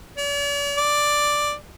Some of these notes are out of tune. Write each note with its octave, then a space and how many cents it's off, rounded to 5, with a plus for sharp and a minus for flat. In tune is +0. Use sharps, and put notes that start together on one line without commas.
D5 -45
D5 +5